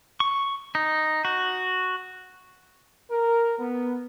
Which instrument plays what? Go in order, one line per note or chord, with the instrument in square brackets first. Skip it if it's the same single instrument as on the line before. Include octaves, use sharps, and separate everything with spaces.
[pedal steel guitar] C#6
D#4
F#4
[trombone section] A#4
B3